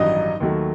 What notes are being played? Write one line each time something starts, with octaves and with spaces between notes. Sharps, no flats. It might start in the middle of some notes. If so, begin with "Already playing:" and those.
Already playing: A1 G2 D#3 F#3 D#4 D#5
D#2 D#3 F#3 A3